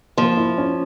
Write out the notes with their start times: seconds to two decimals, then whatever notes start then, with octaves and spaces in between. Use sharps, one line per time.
0.17 F3 A#3
0.37 E4
0.58 C#4